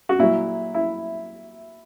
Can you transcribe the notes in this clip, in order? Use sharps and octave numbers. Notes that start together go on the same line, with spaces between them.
F#4
A#2 F#3 E4
E4